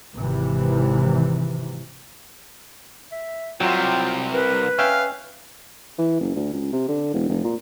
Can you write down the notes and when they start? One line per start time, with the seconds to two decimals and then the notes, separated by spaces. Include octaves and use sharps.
0.16 G#1 C3 E3
3.12 E5
3.60 C2 C3 F#3 F4 G5
4.33 A#4 B4
4.78 C#4 E5 F5 G5
5.98 E3
6.21 F#1
6.36 D2
6.54 C#2
6.72 C3
6.88 D3
7.14 E1
7.29 F1
7.45 A#2